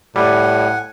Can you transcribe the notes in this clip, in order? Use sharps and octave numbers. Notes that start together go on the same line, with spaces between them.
A2 G3 F#5 G#5